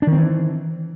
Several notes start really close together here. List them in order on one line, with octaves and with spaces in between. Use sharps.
D4 D#3 C4 E3